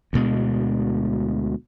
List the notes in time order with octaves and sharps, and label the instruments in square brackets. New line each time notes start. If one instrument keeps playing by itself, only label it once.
[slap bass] D2 B2 G#3